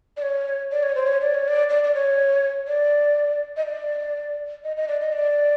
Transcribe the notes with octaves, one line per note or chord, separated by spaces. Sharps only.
D5
C#5
D5
C#5
C5
C#5
D5
C#5
D5
D5
D5
C#5
D5
D#5
D5
D#5
D#5
D5
D#5
D5